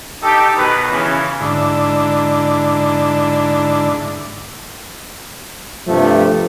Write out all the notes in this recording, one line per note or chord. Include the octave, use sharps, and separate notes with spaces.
D#4 G4 A4
B2 D#3 B4
C#3 E3 C#4
G#2 D3 D4 E4
G2 C3 F3 A3